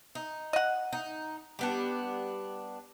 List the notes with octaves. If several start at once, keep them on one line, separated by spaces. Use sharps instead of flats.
D#4
D#5 F#5
D#4
G3 B3 D4